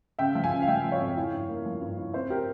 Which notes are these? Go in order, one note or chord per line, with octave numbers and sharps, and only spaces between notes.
C#3 E5 G5
F3
F5 G#5
C#3
F5
F3 E5 G5
F3
C#5 F5
F2
E4
G2
A#3
F3
G2
E4
C4 C5 E5
G4 A#4